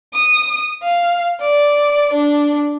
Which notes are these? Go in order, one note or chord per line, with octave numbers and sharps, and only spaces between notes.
D#6
F5
D5
D4